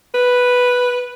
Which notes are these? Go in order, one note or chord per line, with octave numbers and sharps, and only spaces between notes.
B4